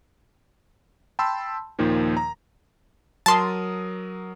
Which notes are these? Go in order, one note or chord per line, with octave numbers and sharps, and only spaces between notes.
G5 A5 B5 C6 E6
D#2 A#2 D#3 F3
A#5
F#3 A#4 A5 C6 D#6